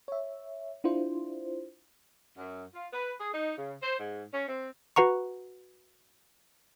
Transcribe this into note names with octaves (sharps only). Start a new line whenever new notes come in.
C#5 E5
D4 E4 F4 C5
F#2
F4
B4
G#4
D#4
C#3
C5
G#2
C#4
C4
F#4 B4 F#5 A#5 C#6